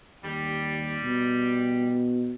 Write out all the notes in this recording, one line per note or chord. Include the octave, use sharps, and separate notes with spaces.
D#2 G3
B2